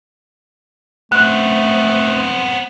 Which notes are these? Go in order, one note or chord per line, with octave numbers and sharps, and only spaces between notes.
A3 B3 C4 F#6